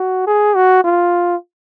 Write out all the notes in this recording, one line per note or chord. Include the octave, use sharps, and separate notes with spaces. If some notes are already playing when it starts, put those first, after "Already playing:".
Already playing: F#4
G#4
F#4
F4